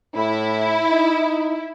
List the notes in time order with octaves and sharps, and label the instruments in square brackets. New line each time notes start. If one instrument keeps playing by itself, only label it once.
[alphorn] A2 [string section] E4
[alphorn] D#4